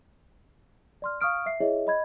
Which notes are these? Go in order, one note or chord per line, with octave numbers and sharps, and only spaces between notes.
D5 C6 F6
F5 C#6 D#6 F6 D7
E5 C7
E4 G#4 C#5 D#5 E5
D#5 B5 G#6